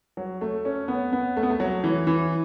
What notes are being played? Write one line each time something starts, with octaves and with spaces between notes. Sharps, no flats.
F#3
A3
C#4
B3
B3
A3
B3
A3
F#3
E3
E3